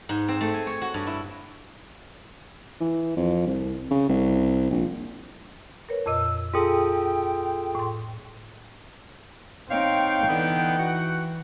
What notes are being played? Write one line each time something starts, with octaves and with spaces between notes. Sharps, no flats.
G#2
C4
A3
G#5
C#5
F#4
G2
E4
E3
F2
C2
C#3
C2
A#1
A#4 B4 C#5
F2 A#2 D#5 E6
F4 G#4 A4 G5
A2 C6
C4 D#4 C#5 F5 G5
D3 E3 B3
F#4 F#5